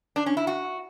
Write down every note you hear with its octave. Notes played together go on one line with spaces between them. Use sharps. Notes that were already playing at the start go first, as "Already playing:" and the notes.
D4
C#4
E4
F#4